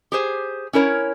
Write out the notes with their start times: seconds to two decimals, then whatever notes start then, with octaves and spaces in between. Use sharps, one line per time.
0.12 G4 G#4 C5
0.73 C#4 E4 A#4 C#5